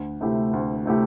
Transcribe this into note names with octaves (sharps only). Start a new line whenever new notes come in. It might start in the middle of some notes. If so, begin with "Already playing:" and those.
Already playing: D2
C3 A3 E4 G4
D2
C3 A3 E4 G4